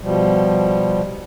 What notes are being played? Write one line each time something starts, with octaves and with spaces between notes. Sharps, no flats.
B2 F3 G3